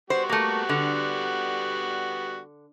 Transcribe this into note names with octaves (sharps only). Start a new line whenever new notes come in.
G3 B3 F#4 C5
A3 A#3
D3